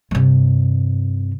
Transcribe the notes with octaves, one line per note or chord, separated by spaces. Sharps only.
G2 C3